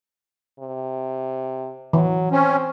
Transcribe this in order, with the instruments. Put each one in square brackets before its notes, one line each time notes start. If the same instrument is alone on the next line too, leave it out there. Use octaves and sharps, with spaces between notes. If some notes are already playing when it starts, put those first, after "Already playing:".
[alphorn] C3
[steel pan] E3 [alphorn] F#3
[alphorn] C4 [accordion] C#4